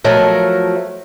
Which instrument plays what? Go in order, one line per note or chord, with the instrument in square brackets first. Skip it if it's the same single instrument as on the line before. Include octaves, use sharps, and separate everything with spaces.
[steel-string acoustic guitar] F3 F#3 A3 A#4